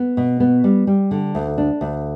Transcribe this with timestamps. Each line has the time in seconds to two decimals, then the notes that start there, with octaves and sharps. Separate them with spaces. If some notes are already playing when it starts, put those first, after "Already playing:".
Already playing: B3
0.17 B2
0.40 B3
0.64 G3
0.87 G3
1.11 D3
1.35 D2
1.58 D4
1.81 D2